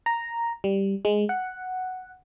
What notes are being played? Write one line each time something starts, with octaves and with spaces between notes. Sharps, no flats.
A#5
G3
G#3
F#5